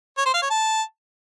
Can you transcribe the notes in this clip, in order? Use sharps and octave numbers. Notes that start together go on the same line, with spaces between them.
C#5
C5
F5
C#5
A5